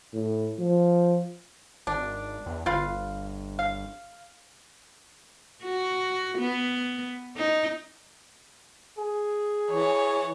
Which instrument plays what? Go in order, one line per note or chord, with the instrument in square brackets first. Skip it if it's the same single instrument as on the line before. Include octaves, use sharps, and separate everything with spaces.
[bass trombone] A2
F3
[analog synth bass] G#1 [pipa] D4
[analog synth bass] E2
[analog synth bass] G1 [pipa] F4 B4 F5
[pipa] F5
[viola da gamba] F#4
B3
D#4
[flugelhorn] G#4
[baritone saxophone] E3 [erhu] C#5